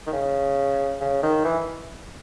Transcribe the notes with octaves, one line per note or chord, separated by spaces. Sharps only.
D#3
C#3
C#3
D#3
E3